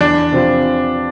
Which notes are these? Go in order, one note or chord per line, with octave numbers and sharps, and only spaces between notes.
E2 D4
C3 F3 C4 F4